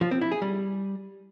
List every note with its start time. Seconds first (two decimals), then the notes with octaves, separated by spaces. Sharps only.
0.01 F3
0.11 C4
0.21 E4
0.32 G#4
0.42 G3